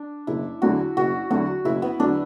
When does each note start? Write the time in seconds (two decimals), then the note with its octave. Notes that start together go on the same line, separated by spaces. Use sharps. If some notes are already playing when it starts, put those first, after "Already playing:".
Already playing: D4
0.27 F#1 E4
0.62 E2 D3 F#3 F#4
0.97 F#1 F#4
1.30 E2 D3 F#3 F#4
1.65 F#1 E4
1.82 B3
1.99 E2 D3 F#3 D4